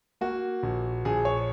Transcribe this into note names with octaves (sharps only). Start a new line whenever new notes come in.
A#3 F#4
A#1
A#1 G#4
C#5